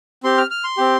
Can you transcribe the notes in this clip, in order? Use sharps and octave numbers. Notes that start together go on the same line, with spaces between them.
C4 G4 C6
F6
F6
C6
C4 G4